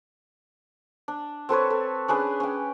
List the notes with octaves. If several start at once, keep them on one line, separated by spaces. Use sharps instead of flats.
D4
C4 A4 B4 C#5
A4
C#4 D4 G#4 B4
C#4 G5